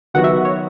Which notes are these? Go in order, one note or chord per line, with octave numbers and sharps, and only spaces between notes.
D#3 F#3 B3 F#4 F#5
E5
C#5